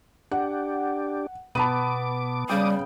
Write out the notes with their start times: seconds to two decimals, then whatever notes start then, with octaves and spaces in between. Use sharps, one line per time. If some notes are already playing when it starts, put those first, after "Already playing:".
0.32 D4 G4 F#5
1.55 B2 B3 A5 B5 D6 D#7
2.49 C#3 G3 G5 D6 D#6